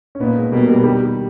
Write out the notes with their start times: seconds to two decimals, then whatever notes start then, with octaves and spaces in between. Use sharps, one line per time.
0.15 C#4
0.20 A#2 B3 D#4
0.36 G#3 B3
0.52 B2 G3 A#3
0.68 G3 A#3
0.84 D#3 G3